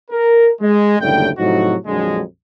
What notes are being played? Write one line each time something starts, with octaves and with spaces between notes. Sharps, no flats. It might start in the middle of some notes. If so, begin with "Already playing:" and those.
A#4
G#3
F#1 D#2 A2 D3 G3 G5
A2 C3 F3 F#3 D#4 F#4
A#1 F2 D3 F#3 G#3